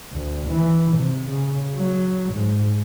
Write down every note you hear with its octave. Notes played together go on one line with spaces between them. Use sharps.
D2
E3
C3
C#3
F#3
G#2